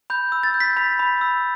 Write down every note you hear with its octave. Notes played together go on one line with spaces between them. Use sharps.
B5 G6
E6
A6
G6
B6
B5 B6
B5
E6